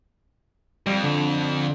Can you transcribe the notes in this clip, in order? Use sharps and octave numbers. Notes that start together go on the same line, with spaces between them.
F2 G3
D3